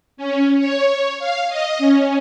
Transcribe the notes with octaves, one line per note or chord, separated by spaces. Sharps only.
C#4
C#5
F5
D#5
C#4